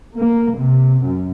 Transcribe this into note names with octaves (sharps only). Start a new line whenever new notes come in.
A#3
C3
F#2